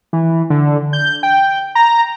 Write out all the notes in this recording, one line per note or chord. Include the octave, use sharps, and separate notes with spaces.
E3
D3
G6
G5
A#5